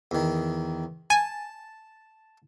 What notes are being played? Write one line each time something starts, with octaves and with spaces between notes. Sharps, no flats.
E2 D#3
G#5 A5